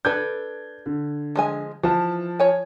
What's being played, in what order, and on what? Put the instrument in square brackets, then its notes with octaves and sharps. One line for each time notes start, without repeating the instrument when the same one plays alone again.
[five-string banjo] D4 A4 B4 [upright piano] G6 G#6
[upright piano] D3
[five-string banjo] F3 G#3 G#5
[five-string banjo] E3 [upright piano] F3 A5
[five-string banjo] C#5 G#5